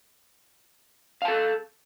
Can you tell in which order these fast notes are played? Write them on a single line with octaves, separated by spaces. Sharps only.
F5 A5 A4